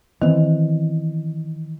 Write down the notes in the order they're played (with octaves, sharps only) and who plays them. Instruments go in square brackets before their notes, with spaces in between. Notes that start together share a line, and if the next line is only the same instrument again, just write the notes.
[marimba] D#3 [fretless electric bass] E3 B3 C4